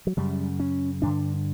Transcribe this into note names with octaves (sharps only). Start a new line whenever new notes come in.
F#3
F#2 C#3 G3
C#4
G2 D3 D4